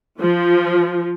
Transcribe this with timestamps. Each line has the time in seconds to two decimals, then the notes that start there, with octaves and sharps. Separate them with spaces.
0.19 F3